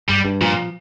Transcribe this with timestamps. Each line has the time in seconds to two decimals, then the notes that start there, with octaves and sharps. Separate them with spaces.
0.09 G2 G3
0.25 G2
0.41 A#2 F3